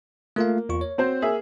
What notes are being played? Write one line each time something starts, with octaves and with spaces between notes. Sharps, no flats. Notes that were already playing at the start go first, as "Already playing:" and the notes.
A3 A#3 F4 F5
E2 F4 C#6
C#5
C4 F#4 C5
A#3 G#4 E5